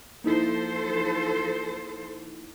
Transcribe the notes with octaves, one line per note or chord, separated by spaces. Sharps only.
F3 A#3 D#4 E4 A4 C5